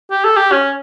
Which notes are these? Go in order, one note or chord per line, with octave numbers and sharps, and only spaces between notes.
G4
A4
G4
C#4